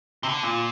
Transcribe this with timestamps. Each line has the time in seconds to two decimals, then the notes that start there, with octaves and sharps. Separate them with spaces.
0.23 C3
0.29 D3
0.43 A#2